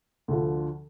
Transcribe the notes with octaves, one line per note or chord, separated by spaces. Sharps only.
D2 D3 F3